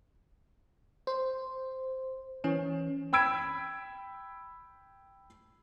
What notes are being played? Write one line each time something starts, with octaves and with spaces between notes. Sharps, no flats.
C5
E3 C#4
G5 B5 E6 G#6 D7